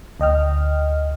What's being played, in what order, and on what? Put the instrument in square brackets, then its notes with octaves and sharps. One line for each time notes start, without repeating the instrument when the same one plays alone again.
[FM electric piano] D2 D#5 G5 F6